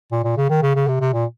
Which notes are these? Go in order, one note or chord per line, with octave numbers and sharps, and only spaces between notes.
A#2
A#2
C#3
D#3
C#3
C#3
C3
C3
A#2